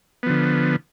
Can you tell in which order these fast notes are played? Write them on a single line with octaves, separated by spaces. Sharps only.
B3 F3 D3